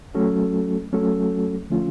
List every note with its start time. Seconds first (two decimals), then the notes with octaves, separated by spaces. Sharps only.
0.15 F#3 A3 C#4 F#4 A4
0.93 F#3 A3 C#4 F#4 A4
1.70 D3 F3 A3 C#4 F4